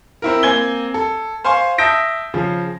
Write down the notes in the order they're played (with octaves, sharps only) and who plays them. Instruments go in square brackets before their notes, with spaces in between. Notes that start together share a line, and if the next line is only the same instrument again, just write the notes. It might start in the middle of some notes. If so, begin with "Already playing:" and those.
[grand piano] C4 E4 A#4
A#3 C4 G#5 G#6 G7
A4
C5 F5 G#5 C6 C#6
E5 A5 D#6 G6 A#6 D7
C#3 F3